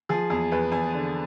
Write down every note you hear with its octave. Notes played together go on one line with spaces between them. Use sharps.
F3 G#4
E2 G#4
E2 B4
E2 G#5
D3